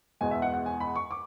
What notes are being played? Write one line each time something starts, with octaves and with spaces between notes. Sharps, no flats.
E2 B2 G#3 G#5
E5
F#5
F#5
G#5
B5
C#6
D6